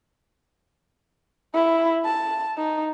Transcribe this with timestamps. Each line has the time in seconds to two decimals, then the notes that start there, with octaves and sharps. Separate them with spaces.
1.54 E4
2.05 A5
2.57 D#4